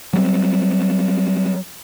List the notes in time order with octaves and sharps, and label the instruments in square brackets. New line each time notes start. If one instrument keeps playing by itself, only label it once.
[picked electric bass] F#3 G3 C4